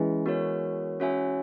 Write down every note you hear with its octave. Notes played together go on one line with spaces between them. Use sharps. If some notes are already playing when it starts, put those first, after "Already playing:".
Already playing: E3 G#3 C#4 E4 G#4 B4
B3 F#4 A#4 C#5
C#4 F#4 C#5 E5 G#5